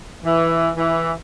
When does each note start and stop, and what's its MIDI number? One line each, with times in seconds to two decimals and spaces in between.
0.25 0.69 52
0.76 1.11 52